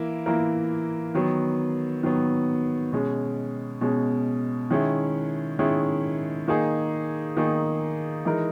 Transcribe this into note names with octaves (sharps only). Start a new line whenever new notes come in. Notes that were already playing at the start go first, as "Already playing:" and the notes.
Already playing: E3 A#3 E4 A#4
E3 A#3 E4 A#4
D#3 F#3 B3
D#3 F#3 B3
B2 G#3 C#4
B2 G#3 C#4
D#3 G#3 C#4 E4
D#3 G#3 C#4 E4
D#3 A#3 D#4 G#4
D#3 A#3 D#4 G#4
E3 G#3 D#4 A#4